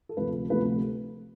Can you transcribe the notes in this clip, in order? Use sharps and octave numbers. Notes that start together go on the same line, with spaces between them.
A4
D2 C3 F3 A3 B4
D2 C3 F3 A3 B4